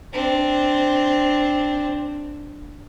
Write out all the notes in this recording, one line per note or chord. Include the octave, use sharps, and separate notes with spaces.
C4 D4